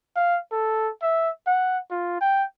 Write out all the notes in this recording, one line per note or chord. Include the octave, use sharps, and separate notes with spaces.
F5
A4
E5
F#5
F4
G5